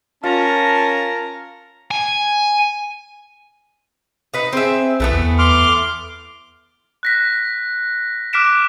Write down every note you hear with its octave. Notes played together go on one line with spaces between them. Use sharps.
C#4 F4 A#4 A5 A#5
G#5
D#4 B4
C4 G#4 E5
B1 E3 A3 B3
E2
C6 D6 F6
F#6 A#6 B6
D6 F6 F#6 B6 D7 E7